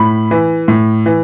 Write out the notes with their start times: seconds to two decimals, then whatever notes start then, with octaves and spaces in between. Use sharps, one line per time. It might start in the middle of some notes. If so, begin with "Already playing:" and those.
Already playing: A2 B5
0.31 E3
0.68 A2
1.06 E3